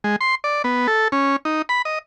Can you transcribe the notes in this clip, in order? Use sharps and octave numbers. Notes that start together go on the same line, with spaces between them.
G#3
C6
D5
B3
A4
C#4
D#4
B5
D#5